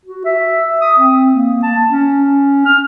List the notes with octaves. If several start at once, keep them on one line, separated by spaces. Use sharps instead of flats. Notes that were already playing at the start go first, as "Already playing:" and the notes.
F#4
E5
D#6
C4
A#3
A5
C#4
F6